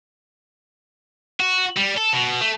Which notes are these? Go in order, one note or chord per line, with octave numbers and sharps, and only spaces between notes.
F#4
G3
A4
B2
A3